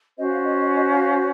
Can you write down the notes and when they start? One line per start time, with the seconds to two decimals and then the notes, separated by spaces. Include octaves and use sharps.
0.17 C#4 F#4 C5 D#5
0.31 F5
0.46 D#5
0.60 D#5
0.75 D#5
0.90 F5